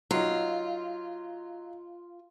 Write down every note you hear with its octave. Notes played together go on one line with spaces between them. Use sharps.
F#3 D#4 F4